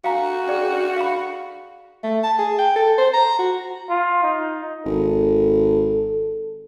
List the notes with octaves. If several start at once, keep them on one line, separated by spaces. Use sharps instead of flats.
F#4 F5 G#5 A#5
G#4 D5 G5
F5 B5
A3
A5
G#4
G5
A4
C5
A#5
F#4
F4
D#4
G#1 A4